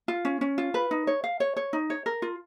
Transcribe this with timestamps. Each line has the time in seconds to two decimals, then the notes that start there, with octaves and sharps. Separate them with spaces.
0.08 F4
0.25 C#4
0.41 C#4
0.58 F4
0.74 B4
0.91 D#4
1.07 C#5
1.24 F5
1.40 C#5
1.57 C#5
1.73 D#4
1.90 C#5
2.06 A#4
2.22 F4